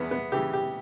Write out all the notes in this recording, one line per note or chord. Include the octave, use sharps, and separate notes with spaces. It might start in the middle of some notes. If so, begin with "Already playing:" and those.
Already playing: E2 B3
B3
C#3 E3 G4
G4